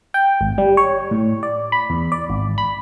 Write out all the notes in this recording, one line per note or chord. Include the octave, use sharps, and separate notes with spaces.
G5
G#1
G3
C#5
A2
D5
B5
E2
D5
G#1
B5